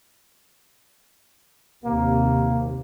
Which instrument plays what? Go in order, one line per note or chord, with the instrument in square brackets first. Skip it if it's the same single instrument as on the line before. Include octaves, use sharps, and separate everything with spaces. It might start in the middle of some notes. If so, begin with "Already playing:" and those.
[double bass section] D#2 C3 [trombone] A#3